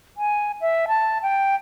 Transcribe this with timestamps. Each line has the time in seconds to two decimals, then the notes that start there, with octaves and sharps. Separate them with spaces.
0.17 G#5
0.61 E5
0.88 A5
1.22 G5